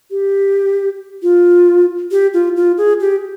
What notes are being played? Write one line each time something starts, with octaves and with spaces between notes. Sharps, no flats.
G4
F4
G4
F4
F4
G#4
G4